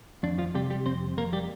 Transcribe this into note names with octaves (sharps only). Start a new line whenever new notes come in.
F2 D4
F3 F4
C3 G3 G4
G3 G4
F2 C4 C5
F2 A#3 A#4
G3 G4